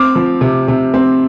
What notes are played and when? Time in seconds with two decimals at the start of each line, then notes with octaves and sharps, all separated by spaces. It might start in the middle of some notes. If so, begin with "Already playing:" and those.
Already playing: C4 D6 F6
0.16 F3
0.41 C3
0.68 C3
0.94 C4